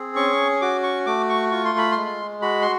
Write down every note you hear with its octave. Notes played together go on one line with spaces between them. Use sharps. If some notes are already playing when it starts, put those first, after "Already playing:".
Already playing: C4 G#4
C#4 C#6
F#4 D6
C#6
A3 D6
C#6
F4 C#6
C6
B5
C6
G#3
F#4 B5
C6